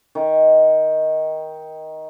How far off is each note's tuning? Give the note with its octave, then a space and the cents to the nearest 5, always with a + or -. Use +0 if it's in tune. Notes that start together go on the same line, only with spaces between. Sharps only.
D#3 +15